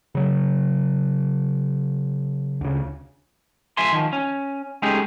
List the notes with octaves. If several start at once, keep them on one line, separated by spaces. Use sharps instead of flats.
C#3 F#3
D2 C#3
F3 E5 G#5 C6
D#3 F3
C#4
G#3 A3 C#4 D#4 G4 G#4